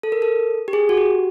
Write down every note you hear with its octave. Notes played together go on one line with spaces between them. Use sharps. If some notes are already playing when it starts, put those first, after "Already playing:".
A4
A#4
A4
G4
G#4
F#4
G4